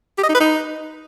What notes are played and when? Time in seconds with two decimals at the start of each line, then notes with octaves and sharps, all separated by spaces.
0.18 G4
0.23 D#5
0.29 D#4
0.34 B4
0.40 D#4